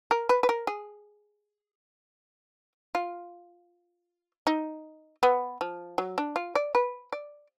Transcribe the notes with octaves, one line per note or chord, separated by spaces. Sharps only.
A#4
B4
B4
A#4
G#4
F4
D#4
B3
F3
F#3
D4
F4
D5
B4
D5